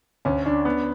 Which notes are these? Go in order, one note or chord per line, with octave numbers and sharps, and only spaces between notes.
D2 C#4
C#4 D4
B3